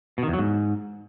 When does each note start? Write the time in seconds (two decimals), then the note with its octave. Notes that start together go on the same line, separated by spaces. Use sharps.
0.18 B2
0.23 D#3
0.28 E2
0.33 F#3
0.39 G#2